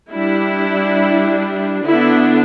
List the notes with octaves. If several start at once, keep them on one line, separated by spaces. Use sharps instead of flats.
G3 D4 E4
D3 B3 D4 E4